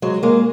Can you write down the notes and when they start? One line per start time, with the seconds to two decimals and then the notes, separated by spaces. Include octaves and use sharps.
0.02 F#3 G#3
0.23 G#3 A#3